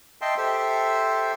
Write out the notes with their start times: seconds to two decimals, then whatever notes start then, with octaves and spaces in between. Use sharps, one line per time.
0.21 D#5 E5 G5 A5 C6
0.38 G4 A4 C5 E5